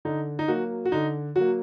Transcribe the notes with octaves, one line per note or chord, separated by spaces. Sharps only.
D3 D#4
D#4
F#3 A#3 F#4
F#4
D3 D#4
F#3 A#3 F#4